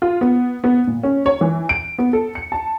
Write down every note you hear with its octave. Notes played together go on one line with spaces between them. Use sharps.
F4
B3
B3
A#2
C#4
C#5
E3
D7
B3
A4
C#7
A5